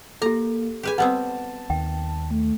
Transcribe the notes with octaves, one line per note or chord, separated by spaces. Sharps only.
A#3 G4 A4 A#5
G4 G#4 B4 G#5
G3 B3 C4 F#5 A5
D#2 G5
A3